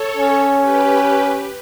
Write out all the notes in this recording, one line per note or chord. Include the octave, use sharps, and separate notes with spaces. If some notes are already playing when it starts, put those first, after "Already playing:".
Already playing: A4 C#5
C#4
G4 B4